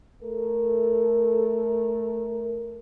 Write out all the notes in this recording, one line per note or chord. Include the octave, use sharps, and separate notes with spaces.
A3 A4 A#4